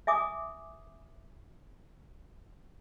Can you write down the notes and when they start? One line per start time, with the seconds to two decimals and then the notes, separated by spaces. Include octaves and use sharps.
0.07 E5 G#5 D6 D#6